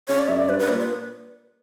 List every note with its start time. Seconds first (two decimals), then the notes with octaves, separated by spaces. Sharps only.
0.08 C#3 C#5
0.19 D5
0.28 F#2 E5
0.39 D5
0.49 G2 B4
0.59 B4
0.69 A#2 D5
0.79 B4